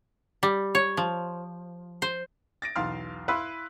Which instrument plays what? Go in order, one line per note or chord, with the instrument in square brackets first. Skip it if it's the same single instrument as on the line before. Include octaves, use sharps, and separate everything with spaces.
[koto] G3
C#5
F3
C5
[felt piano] A6 A#6 D7
B1 E2 F5 C6 F6
E4 B4 F5 B5 C6 E6